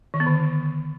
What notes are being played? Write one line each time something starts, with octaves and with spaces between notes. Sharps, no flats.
D#3
B3
D3